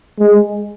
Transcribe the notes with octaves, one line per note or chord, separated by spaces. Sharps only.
G#3